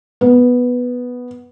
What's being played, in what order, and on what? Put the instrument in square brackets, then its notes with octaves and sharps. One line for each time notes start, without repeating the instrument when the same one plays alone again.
[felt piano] B3